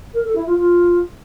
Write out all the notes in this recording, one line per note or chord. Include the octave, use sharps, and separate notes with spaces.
A#4
A4
E4
F4
F4